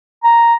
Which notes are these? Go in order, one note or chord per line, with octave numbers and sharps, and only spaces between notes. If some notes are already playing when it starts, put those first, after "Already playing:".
A#5